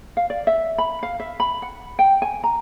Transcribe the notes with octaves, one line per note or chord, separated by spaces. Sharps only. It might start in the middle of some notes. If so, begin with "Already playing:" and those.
F5
D5
E5
B5
F5
E5
B5
F#5
G5
G#5
A#5